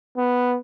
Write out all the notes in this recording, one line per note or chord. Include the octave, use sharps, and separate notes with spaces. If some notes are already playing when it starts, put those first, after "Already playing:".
B3